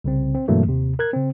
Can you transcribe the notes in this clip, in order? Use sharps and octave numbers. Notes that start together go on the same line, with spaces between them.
C2 C#3 C4
C4
G2 B2 E3 F#3 A3 A#3
D#2 C3
A#4 F#6 G#6
C#3 C4